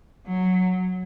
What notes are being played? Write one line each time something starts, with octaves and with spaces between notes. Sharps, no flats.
F#3